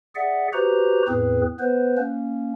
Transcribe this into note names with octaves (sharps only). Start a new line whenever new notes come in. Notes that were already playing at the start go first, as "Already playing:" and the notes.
G#4 D5 E5 F#5
F#4 G4 B4 C5 A#5
E2 A2 C4 G#4 B4
B3 B4 C5
A#3 C#4